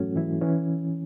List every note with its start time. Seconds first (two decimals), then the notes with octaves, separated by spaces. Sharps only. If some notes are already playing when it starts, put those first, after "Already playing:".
Already playing: G#2 E3 F#3 A3 C#4 F#4 A4
0.16 E3 E4
0.41 E3 C#4